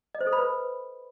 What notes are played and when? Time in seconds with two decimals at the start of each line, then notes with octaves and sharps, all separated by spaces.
0.15 D#5
0.21 C5
0.27 A4
0.33 B5
0.39 B4